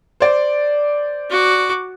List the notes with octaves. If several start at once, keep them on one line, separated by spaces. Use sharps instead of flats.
C5 D5
F#4 D6